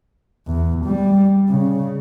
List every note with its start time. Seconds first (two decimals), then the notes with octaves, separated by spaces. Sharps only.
0.47 E2
0.86 G3
1.50 C#3